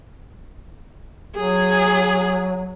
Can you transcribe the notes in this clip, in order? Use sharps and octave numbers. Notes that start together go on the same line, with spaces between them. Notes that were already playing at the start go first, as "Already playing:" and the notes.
F#3 G#4